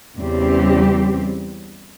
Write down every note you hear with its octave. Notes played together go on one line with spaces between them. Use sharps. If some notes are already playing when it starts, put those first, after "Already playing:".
E2 C#3 G3 C4 G4